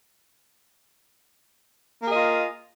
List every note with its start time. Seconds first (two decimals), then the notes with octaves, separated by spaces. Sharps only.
2.02 A#3
2.06 G#4
2.10 D#5
2.14 F4